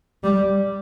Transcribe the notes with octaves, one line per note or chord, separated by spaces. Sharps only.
G3